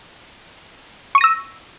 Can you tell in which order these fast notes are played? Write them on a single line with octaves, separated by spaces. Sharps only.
C#6 D#7 A#6 E6